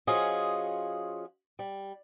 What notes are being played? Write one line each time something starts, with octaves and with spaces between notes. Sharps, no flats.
F3 C#4 F4 F#4 G#4 D#5
G3